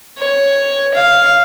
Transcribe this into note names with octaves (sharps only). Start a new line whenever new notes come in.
C#5
F5